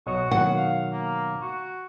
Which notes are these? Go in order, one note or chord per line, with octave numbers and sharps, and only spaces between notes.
B1 F#4 C#5 D#5
B2 D#3 F#3 F#5
F5
A#3
F#4